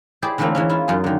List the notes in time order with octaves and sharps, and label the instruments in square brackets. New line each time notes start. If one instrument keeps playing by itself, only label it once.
[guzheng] E4 G4 G#4 C5 D5
D3 E3 A3 A#3 C4 C#4
E3 G#3 C#4
E4 F4
F#2 D#4 F4 G#4
D3 D#3